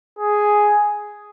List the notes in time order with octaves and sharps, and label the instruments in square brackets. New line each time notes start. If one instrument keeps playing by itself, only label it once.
[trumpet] G#4